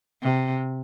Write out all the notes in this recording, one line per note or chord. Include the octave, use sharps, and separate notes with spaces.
C3